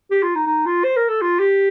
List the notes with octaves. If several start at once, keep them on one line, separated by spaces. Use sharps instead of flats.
G4
F4
D#4
D#4
F4
C5
A#4
A4
F4
G4